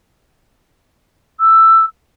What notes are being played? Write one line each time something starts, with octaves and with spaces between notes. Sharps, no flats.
E6